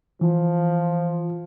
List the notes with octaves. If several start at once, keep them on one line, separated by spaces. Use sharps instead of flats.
E3 F3